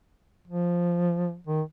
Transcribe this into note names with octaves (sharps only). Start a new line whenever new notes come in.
F3
D#3